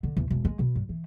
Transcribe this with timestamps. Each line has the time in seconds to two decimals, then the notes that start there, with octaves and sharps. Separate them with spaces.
0.03 D3
0.17 E2
0.30 E1
0.45 G#3
0.59 B2
0.75 G2
0.89 E3